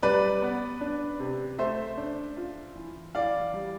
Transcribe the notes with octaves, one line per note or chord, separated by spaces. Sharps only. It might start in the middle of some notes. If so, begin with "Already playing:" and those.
G3 B4 D5
B3
D4
C3
A3 C5 E5
D4
F4
E3
E3 D5 F5
G3